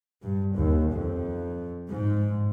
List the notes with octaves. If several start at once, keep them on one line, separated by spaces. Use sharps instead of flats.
G2
D#2
F2
G#2